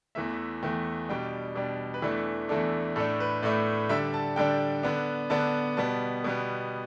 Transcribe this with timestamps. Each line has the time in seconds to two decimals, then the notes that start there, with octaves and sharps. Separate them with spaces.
0.15 E2 E3 A3 E5
0.63 E2 E3 A3 G5
1.09 B2 G3 D4 G5
1.55 B2 G3 D4
1.94 B4
2.02 E2 E3 A3 D4 A4
2.49 E2 E3 A3 D4 A4
2.96 A2 A4
2.99 A3 D4
3.20 B4
3.43 A2 A3 D4 D5
3.89 D3 G3 D4 E5
4.14 A5
4.36 D3 G3 D4 G5
4.83 D3 B3 D4
5.30 D3 B3 D4 A5
5.77 B2 G3 B3 A5
6.24 B2 G3 B3